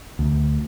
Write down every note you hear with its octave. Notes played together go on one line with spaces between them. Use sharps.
D2